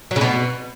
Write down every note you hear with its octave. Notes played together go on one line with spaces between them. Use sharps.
F#3
C#3
B2